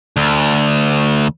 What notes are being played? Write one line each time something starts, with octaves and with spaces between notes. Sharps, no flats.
D2